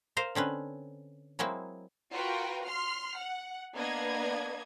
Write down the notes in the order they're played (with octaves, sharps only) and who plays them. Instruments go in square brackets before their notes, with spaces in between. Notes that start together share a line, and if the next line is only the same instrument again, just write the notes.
[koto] A#4 C5 F5
D3 C4 C#4 B4
F#3 G#3 A#3 C4 E4
[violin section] F4 F#4 A#4 B4 G5
C6 F6 C7
F#5
A#3 B3 D4 D#5 G#6